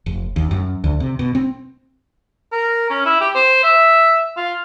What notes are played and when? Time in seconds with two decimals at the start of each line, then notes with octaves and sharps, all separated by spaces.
0.06 F1
0.36 D#2
0.51 F#2
0.84 D2
1.00 C3
1.19 B2
1.35 C4
2.52 A#4
2.90 C#4
3.05 E4
3.21 G4
3.35 C5
3.63 E5
4.37 F4